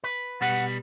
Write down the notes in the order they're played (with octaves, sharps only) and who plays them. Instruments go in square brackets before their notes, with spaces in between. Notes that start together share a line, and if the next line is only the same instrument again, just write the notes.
[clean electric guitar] B4
[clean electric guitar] B2 G3 B4 [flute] F#5